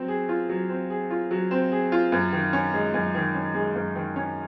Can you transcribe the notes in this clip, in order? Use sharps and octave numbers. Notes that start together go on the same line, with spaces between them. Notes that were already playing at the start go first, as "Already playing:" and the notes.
Already playing: F#3 C4
G#4
F4
F#3
C4
G#4
F4
F#3
C4
G#4
F4
F#2
D#3
C#4
G#3
F#2
D#3
C#4
G#3
F#2
D#3
C#4